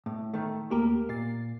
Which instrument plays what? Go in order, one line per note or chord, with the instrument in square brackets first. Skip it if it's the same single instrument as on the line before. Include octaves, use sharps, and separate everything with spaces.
[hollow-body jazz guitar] A2
D#3 A3
[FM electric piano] D#2 A3 A#3 [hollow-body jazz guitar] G4 A#4
[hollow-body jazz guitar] A#2 [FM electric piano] A6 C7